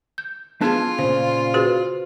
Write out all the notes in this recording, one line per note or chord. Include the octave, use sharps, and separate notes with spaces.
G6
B3 D4 F4 G#4 B4 A5 G#6
A#2 C#3 C5
F#4 G#4 B4